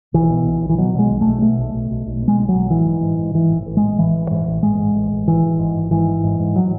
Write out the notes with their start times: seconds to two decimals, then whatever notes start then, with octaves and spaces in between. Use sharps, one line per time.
0.14 B1 E3
0.30 B2
0.46 B1
0.62 B1
0.69 E3
0.78 B2 F#3
0.94 B2
0.99 G#3
1.11 B1
1.21 B1 A3
1.42 B2 A3
1.59 B1
1.74 B1
1.91 B1
2.06 B1
2.22 B2
2.28 G#3
2.38 B1
2.49 F#3
2.54 B1
2.70 A1 E3
2.86 G#2
3.02 G#2
3.18 G#2
3.34 G#2 E3
3.50 A1
3.66 A1
3.77 G#3
3.82 A1
3.98 A1 E3
4.14 A1
4.31 G#2
4.47 A1
4.63 A1 G#3
4.79 G#2
4.95 A1
5.12 A1
5.27 G#1 E3
5.43 G#1
5.59 G#2
5.75 G#1
5.91 G#2 E3
6.07 G#1
6.24 G#2
6.40 G#2
6.56 F#3